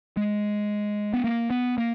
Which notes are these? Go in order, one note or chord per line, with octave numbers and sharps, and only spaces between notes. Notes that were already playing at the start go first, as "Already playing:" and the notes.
G#3
B3
A#3
B3
A#3